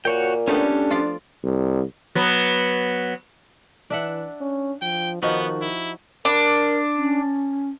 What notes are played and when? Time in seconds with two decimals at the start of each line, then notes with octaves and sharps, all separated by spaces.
0.05 A#2 F#4 C#5 G5
0.47 G3 A3 B3 C#4 D4 G4 A4
0.90 F3 F4 D5
1.43 C2
2.15 F#3 B3
3.90 E3 D4 E5 F#5
4.41 C#4
4.82 F3 G5
5.22 D#3 F3 B3 D#4 F#4
5.62 E4
6.25 D4 A#4
6.97 C#4